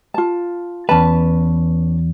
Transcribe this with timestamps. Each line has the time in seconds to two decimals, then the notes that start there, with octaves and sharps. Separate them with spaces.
0.14 F4 A5
0.89 E2 C#4 B4 A5